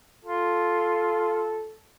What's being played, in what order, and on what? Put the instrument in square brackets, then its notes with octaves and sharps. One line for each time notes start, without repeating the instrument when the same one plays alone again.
[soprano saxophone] F4 [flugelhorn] A4